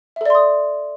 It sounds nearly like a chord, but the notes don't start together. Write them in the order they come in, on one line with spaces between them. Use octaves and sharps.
E5 A4 D5 C6 D#6